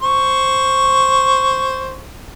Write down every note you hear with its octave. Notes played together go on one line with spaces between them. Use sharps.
C5 C#6